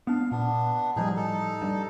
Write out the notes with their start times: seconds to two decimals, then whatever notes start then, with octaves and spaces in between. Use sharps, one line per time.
0.07 B3 D4 F5
0.31 A#2 B3 D4
0.96 A2 F3 G3 D#4 G#4
1.17 D#4 A4
1.62 G2 G3